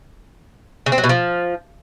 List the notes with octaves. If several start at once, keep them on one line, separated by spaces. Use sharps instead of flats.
C#3
C4
F#3
B2
F3